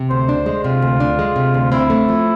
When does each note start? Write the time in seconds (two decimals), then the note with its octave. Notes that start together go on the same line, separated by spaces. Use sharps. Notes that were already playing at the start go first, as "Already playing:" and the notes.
Already playing: C3
0.10 D2 C5
0.29 D4
0.46 G#3
0.64 C3 F4
0.82 D2
1.00 D4
1.19 G#3
1.36 C3
1.54 D2
1.72 C4 E4
1.90 A3
2.09 F3